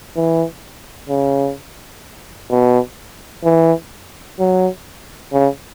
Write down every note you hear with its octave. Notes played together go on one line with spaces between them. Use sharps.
E3
C#3
B2
E3
F#3
C#3